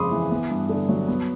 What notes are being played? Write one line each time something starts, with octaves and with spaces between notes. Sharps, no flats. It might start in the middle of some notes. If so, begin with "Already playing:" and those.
Already playing: F2 C#3 G#3 B5 C6 D6 D#6
E3
B3
G2
D3
F#3
B3